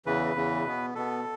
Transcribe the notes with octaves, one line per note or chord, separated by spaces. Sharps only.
E2 C#3 E3 B4
E2 C#3 E3
B2 B3
B2 B3 A4